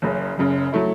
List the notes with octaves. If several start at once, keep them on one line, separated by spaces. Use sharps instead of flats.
F#1 F#2 C#3
F#1 F#2 C#3
F#3 A3 E4